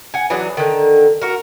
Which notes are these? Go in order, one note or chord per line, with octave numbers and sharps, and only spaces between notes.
F#5 G#5
E3 F#3 D4 G#4
D3 D#3
F#4 A#4